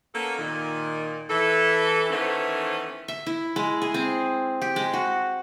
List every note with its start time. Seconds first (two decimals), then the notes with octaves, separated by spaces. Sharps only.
0.14 A#3 B3 C#4 A4
0.38 A#2 D#3
1.30 E3 A4
2.11 D#3 E3 A3 B3 C#4 C5
3.08 E5
3.26 E4
3.56 G#3
3.82 G#4
3.94 C4
4.62 G4
4.76 G#3
4.93 F#4